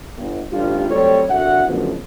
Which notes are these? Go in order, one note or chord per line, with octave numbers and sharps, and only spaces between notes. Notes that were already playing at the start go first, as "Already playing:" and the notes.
G1
A1 G2 F4 G4
F#3 G3 A3 C4 A4 C#5
G1 C2 D3 F#4 E5 F#5
F#1 D2 B2 F3